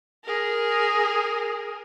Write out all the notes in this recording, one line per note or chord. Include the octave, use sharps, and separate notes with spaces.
G#4 A#4